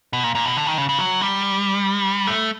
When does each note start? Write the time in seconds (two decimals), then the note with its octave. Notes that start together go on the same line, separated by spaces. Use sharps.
0.13 B2
0.24 A#2
0.35 A#2
0.45 B2
0.57 D3
0.66 D#3
0.78 C#3
0.89 C#3
0.99 F#3
1.21 G3
2.27 A3